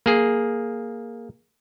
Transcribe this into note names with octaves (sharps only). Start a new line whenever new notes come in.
A#3 G#4